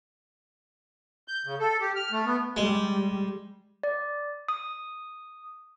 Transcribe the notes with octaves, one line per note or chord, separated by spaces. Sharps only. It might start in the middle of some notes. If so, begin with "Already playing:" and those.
G6
C#3
A4
G4
F6
A3
B3
G3 G#3
D5
D#6